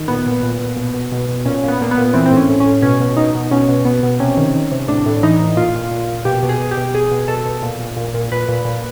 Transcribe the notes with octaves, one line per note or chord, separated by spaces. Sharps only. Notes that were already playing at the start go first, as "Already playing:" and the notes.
Already playing: D#3
A#2 B3
A#2
A#2
A#2
B2
B2
B2
B2
A#2 C#4
A#2 B3
A#2 A#3
B3
A#2
E3 C4
C4
A2
C#4
A2
C#4
A2
B2 C#4
B2
B2 D#4
B2
B2 C#4
B2
B2 B3
B2
C3 C#4
D#3
D#3
C3
A2 D4
A2
E3 D#4
A2
A#2 F4
A#2
A#2
A#2
B2 G4
B2
G#4
B2
G4
B2
B2 G#4
B2
B2 A4
B2
A#2
A#2
A#2
A#2
A#2 B4
A#2
A#2